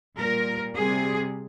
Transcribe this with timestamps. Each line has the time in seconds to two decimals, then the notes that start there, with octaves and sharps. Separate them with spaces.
0.17 A#2 G3 A#4
0.76 C3 G3 G#4